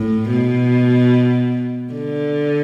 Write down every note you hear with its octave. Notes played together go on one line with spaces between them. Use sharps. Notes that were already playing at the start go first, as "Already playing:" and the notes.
Already playing: A2
B2
D3